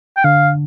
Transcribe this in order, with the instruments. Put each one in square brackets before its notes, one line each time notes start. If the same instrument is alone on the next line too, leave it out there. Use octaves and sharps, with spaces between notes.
[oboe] G5
[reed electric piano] D3 [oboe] F5